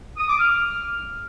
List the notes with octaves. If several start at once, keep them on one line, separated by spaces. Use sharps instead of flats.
D#6
D6
F6